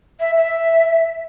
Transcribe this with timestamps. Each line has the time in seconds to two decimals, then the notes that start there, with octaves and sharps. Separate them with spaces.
0.20 E5
0.37 E5